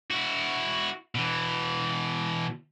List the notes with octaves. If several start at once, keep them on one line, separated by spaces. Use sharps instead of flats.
E4 F#4
B2 E3